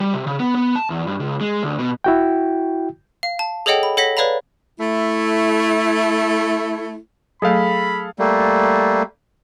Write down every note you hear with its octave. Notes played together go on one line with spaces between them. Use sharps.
G3
C3
C#3
B3
B3
A5
E2
G2
C#2
G#3
D2
B2
E4 F#4 G5
F5
A5
G#4 A4 C#5 D#5 F#5 G5
B5
A4 C#5 F#5 A#6 B6
B4 C#5 D5 F5 A#5 B5
A3 E4
F#3 A3 G#4 A4 F5 B5
G3 A3 A#3